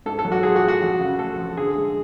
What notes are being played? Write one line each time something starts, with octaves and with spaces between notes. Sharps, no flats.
G#2 A4
A4
F#3
F#4
F4 G#4
F#4
A3
F#4
F2
C#3
A3 A4
F3
D3 G#4
G#3